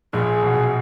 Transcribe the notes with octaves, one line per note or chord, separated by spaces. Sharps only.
A#1 A#2 G#4
B1 B2